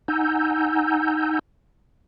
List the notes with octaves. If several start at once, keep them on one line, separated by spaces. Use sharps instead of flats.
D#4 F#5 G#5 A#5 E6 G6